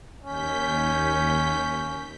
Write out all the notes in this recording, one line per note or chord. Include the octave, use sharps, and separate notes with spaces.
D#2 C#4 G6 B6